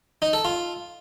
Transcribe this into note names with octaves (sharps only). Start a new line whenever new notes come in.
D#4
A4
F4